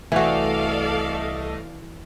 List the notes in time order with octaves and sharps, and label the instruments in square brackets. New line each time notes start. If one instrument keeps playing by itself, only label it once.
[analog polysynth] C2 A3 D#5 [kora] E3 F#4 [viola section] A4 D5 F5